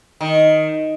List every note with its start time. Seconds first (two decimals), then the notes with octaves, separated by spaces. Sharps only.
0.21 D#3